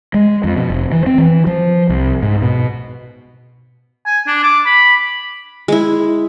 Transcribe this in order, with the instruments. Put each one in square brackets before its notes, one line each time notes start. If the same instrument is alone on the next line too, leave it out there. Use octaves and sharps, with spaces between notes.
[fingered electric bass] G#3
F2
B2
F1
E3
C4
E3
F3
C2
G#2
B2
[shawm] G#5
D4
D6
B5
[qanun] G#3 E4